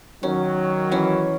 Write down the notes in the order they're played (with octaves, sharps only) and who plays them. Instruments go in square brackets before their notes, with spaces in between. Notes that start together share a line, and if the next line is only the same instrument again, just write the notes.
[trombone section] D#3 F#3 [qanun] C#4
[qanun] E3 C#4